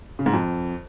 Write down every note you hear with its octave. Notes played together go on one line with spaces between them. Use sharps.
C#3
G#2
F2